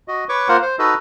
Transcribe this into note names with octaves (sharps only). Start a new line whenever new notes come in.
F#4 D#5
B4 C#5 C#6 D6
A#3 F4 A#4 C5 F#5
C5
D#4 F#4 A4 B4 D#5